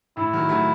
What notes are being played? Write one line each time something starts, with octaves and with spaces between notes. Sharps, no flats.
A2 E4
D#3 F#3
F#3 A3